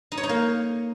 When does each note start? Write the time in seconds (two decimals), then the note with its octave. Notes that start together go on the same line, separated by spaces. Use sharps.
0.12 D#4
0.18 C#5
0.23 D#4
0.29 A#3